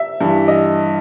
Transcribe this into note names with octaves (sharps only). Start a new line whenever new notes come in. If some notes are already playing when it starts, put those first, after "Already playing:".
Already playing: E5
G2 E3
D#5